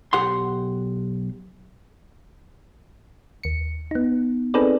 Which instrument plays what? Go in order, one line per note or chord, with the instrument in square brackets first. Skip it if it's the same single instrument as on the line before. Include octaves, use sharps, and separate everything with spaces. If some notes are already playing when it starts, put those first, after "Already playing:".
[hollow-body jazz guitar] B1 G4 F#5 C6
[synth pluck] D#2 C#7
B3 D#4
C4 D#4 G#4 A4 B4 D5